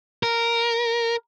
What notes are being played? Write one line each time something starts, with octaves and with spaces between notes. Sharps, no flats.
A#4